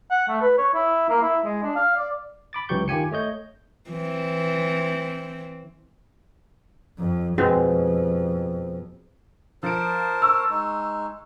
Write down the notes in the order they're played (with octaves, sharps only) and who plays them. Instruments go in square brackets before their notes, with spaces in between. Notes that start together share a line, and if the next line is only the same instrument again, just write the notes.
[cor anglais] F#5
A3
B4
C#5
E4
A#3
E4
G#3
D4
F5
D5
[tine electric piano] B5 D6 A6
C#2 E3 F#3 G4 C#6 G6
D#3 F4 G4 G#5 C#7
A3 C#5 D#5 G6
[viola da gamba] E3 C4
[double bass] F2
[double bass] F2 [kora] B2 [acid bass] C4 [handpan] G#4
[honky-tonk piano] F3 D7 [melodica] A#4 C5 A5
[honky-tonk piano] C#6 E6
[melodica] G#3 D#4